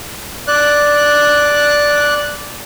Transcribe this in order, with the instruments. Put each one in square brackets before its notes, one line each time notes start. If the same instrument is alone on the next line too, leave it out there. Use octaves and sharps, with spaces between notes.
[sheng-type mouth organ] D5 F#6